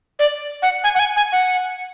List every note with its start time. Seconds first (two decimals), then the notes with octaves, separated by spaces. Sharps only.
0.19 D5
0.62 F#5
0.84 G#5
0.95 F#5
0.99 G#5
1.16 G#5
1.32 F#5